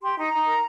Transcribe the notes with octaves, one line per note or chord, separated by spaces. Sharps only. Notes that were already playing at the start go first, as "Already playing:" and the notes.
G4 C6
D#4 A#5
D#4
A#4